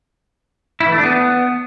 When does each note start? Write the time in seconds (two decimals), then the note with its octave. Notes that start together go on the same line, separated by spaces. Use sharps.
0.80 E4
0.86 E3
0.92 A3
0.98 D4
1.04 B3